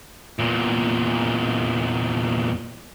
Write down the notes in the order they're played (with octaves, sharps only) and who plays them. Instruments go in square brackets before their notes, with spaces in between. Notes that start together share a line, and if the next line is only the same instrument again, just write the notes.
[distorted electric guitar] E2 A#2